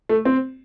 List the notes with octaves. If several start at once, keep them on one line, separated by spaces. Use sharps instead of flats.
A3
C4